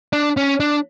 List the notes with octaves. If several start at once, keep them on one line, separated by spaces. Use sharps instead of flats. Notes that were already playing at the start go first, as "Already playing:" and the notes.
D4
C#4
D4